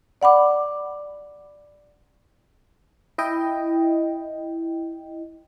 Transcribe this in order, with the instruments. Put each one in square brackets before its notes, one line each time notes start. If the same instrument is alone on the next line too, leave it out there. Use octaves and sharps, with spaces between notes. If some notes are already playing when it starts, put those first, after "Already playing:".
[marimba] D5 F#5 B5 D6
[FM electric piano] E4 D#5 G5